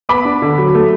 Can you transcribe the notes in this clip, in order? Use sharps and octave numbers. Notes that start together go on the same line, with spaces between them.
B3 B5 D6
D4
D3
F#3
A3